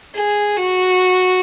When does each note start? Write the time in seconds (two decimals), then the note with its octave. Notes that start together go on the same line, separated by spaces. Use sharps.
0.14 G#4
0.57 F#4